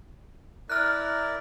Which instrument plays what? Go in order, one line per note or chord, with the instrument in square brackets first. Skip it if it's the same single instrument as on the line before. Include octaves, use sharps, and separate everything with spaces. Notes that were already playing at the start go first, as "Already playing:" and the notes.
[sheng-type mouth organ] E4 A#4 D5 [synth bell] F6 F#6